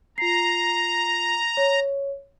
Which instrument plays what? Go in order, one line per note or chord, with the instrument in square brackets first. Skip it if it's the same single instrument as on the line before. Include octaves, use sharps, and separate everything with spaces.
[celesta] F4 C7 [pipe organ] A#5
[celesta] C#5